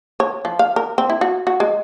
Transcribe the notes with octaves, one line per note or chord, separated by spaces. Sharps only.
C#5
F3
F5
A#4
C4
E4
F#4
F#4
G#3